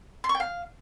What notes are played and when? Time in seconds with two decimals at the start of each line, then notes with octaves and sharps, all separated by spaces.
0.24 C6
0.29 C#6
0.35 G5
0.40 F5